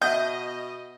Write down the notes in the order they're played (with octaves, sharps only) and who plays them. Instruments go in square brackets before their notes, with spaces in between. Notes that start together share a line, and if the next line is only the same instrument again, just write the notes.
[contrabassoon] B2 [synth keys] D#5 [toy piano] E5 F#5 A5 [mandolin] G6